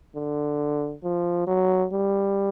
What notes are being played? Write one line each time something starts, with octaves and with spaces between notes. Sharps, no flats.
D3
F3
F#3
G3